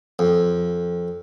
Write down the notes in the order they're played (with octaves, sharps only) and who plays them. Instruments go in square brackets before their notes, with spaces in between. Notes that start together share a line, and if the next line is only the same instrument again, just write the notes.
[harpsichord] F2